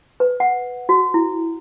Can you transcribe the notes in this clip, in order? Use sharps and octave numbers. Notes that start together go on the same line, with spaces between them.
B4
F#5
F#4
E4